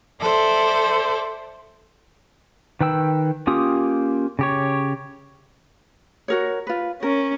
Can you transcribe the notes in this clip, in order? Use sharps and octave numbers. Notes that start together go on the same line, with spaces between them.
A4 C5 D5 E5
D#3 B4 G5 E6
A#3 C#4 F4 G4 D#6
C#3 G4 C#5
F#4 A#4 C#5
F4 B4
C#4 A#4